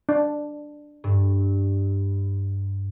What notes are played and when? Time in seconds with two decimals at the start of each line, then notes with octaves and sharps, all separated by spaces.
0.09 D4
1.04 G2